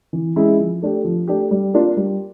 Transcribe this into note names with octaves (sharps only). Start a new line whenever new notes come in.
E3
G#3 C#4 E4 G#4
F3
A3 D4 G4
F3
A3 D4 G4
G3
A#3 D4 F4
G3